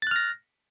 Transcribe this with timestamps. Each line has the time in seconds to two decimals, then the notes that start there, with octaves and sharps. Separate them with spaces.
0.02 A6
0.07 F#6
0.11 F6
0.16 A#6